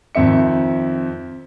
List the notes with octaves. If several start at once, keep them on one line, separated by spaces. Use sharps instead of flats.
F2 D#3 C4 E5 C#7